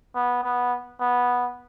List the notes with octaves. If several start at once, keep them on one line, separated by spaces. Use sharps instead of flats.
B3
B3
B3